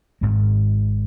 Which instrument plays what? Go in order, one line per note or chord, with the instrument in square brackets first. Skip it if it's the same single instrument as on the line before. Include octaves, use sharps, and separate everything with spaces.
[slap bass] G#1 G#2 G#3